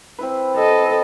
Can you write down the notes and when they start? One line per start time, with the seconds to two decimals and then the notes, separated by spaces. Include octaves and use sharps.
0.19 C4 E4 B4
0.57 A4 D#5